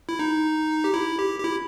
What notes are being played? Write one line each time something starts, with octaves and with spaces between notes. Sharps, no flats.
E4
D#4
G4
E4
G4
G4
E4